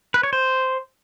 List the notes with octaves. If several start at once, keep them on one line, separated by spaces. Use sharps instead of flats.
B4
C#5
C5